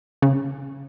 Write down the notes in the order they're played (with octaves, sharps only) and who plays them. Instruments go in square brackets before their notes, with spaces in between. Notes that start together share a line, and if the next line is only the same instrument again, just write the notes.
[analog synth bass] C#3